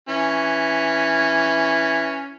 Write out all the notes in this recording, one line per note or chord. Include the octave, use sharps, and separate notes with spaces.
E3 C#4